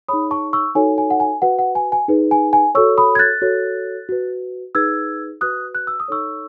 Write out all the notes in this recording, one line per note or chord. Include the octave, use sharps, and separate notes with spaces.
D#4 G#4 C#5 B5 D#6
A5 C#6
C#6 E6
D#4 F#4 A4 C#5 G#5
G#5
F#5
G#5
F#4 B4 F#5
F#5
G#5
G#5
D#4 G#4 B4
G#5
G#5
F#4 A4 C#5 C#6 E6
B5 D#6
G#6
F#6 A6
F#4 A4 C#5
F#4 B4
D#4 G#4 B4 E6 G#6
F#4 B4 D#6 F#6
F#6
E6
D#6
D#4 A4 C#5 C#6 E6